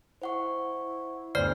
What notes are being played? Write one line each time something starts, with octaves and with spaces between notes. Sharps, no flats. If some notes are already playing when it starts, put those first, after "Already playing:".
E4 C5 F#5 C#6
G1 D2 C5 D5 F6 C7